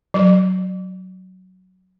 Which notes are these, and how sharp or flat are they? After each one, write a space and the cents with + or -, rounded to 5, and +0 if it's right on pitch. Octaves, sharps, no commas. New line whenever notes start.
F#3 +5